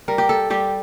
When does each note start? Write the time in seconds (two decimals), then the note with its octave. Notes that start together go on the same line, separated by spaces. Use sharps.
0.08 G3 A#4
0.18 G4
0.29 A4
0.50 G3 G4